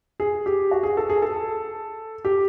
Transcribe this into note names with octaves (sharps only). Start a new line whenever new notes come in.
G#4
G4
F#4
G#4
A4
G#4
A4
G4